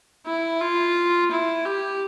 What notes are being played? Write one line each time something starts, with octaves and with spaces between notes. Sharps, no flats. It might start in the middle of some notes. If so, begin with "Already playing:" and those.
E4
F4
E4
G4